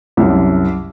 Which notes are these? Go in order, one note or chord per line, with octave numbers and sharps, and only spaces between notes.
C2 F#2